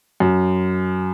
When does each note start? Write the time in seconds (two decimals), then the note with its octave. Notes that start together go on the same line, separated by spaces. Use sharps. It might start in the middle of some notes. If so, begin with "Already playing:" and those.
0.20 F#2